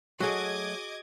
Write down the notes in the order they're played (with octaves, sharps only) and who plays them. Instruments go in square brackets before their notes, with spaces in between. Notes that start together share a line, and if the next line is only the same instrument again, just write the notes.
[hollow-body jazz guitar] F#3 A3 [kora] F#4 G#4 [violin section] D#5 D6 G#6